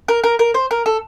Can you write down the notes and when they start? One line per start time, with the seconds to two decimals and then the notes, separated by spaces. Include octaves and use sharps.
0.08 A#4
0.24 A#4
0.39 A#4
0.54 C5
0.71 A#4
0.86 A4